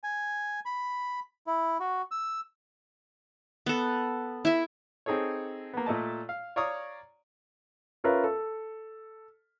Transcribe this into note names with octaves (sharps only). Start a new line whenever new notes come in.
G#5
B5
E4
F#4
E6
B3 A4
E4 E5
C4 D#4 G#4 A4 C#5
A#3 B3
A#2 A3 D#5 A5
F5
C#5 D5 F5 A#5 C#6 D#6
C#4 F4 A#4 B4 E5
A4